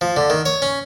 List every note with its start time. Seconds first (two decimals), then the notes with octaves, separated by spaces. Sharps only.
0.01 F3
0.16 D3
0.30 D#3
0.46 C#5
0.62 C#4